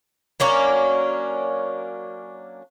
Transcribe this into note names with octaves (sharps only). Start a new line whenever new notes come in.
F#3 A#3 C#4 D4